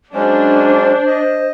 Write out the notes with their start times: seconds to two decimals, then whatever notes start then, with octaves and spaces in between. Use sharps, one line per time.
0.14 F#3 G#3 C#4 D4 C5
1.07 D#5